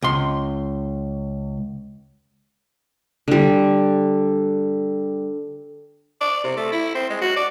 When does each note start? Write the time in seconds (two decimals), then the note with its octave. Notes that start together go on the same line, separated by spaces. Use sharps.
0.02 C#2 C6
3.28 D3 G3
6.21 D5
6.44 C3
6.57 A3
6.72 E4
6.95 C4
7.10 G#3
7.21 F#4
7.36 D5